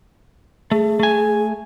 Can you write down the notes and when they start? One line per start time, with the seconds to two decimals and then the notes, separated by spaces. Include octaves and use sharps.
0.71 A3 G#4
1.00 A3 G#5